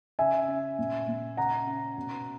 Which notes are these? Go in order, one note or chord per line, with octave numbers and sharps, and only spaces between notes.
C#3 E5 G#5
C#4
A#2
A#2
C#3 F#5 A#5
C#4
B2